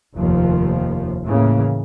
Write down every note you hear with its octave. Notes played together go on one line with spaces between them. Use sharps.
F1 D#2 F3
A2 C#3 E3 A#3